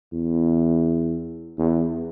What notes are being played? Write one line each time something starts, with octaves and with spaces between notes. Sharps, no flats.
E2
E2